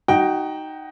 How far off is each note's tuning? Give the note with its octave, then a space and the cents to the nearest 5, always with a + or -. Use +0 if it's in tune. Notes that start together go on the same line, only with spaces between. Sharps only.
D#4 +0 F#4 +25 G5 +0